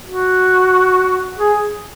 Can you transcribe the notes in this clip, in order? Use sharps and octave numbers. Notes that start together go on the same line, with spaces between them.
F#4
G#4